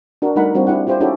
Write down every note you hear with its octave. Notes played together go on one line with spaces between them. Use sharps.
D4 F#4 A#4
G3 A3 D#4 A#4 F#5 B5
G3 C4 D4 F4 F#4
D4 E4 G4 F#5
E4 F4 G4 C5
C#4 D#4 E4 F#4 G4 A4